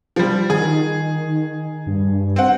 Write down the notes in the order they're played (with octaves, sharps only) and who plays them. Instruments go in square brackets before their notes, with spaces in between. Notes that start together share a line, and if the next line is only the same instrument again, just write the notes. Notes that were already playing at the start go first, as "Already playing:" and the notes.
[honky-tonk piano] F3 G3
[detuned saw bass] D#3 [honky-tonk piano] G#4
[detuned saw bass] G2
[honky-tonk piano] C4 F#5